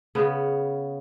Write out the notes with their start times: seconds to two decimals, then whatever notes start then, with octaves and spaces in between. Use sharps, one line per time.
0.15 C#3 B3